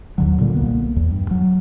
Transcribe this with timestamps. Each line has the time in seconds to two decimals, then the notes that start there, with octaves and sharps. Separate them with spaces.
0.18 D#2 D3 F#3
0.39 A#2 D3 G3 A#3
0.55 C2 A#3 B3
0.96 E2
1.10 G2
1.31 F#3